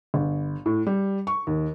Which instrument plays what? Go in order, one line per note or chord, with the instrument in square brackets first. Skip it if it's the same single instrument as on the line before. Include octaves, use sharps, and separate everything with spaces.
[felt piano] G1
A2
G3
C#6
D#2